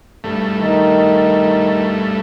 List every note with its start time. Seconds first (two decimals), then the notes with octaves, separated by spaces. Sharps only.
0.24 G2 A3
0.61 D#3